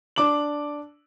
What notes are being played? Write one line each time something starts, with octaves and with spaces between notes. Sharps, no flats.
D4 D6 F#7